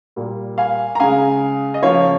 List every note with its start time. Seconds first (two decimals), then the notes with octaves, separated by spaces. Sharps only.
0.16 A#2 G3 A#3
0.58 F5 G#5
0.95 A#5
1.00 C#3 G#3 F5 G#5
1.74 D#5
1.83 C#3 F3 A#3 C#5 F5